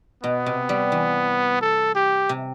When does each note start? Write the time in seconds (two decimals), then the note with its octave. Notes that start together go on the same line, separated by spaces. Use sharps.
0.23 B2 B3
0.46 C3
0.69 G3
0.92 E3
1.61 A4
1.95 G4
2.29 C3